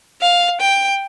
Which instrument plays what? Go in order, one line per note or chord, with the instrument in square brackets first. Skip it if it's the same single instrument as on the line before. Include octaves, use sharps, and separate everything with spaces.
[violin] F5
G5